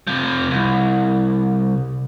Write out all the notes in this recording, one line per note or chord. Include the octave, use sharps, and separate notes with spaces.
C3 F3
C2